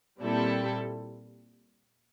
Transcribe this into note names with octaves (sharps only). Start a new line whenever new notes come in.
A#2 G3 C4 E4 A4